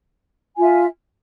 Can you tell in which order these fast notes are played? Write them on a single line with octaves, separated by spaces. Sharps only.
G#5 F4 E5